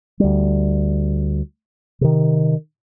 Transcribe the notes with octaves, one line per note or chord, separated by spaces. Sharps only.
D2 G3
C3 D#3